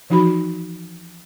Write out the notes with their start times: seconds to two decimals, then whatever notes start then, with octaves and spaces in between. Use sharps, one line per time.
0.10 E3 F3 D#4 F#4 B5